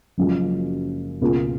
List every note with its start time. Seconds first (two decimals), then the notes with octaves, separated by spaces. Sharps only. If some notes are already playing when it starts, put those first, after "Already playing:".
0.18 F#1 F#2 F3 G#3
1.21 C#2 B2 A#3 F4 G#4